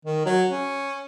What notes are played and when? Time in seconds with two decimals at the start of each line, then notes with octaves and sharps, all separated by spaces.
0.05 D#3
0.26 F#3
0.50 C#4